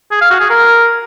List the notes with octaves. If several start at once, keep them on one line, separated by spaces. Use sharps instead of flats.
G#4
F5
F#4
G#4
A#4